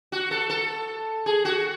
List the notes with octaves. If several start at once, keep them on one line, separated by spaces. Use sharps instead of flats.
F#4
A4
A4
G#4
F#4